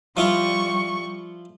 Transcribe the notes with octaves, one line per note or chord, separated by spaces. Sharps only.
F3 G3 E4 F4 C#6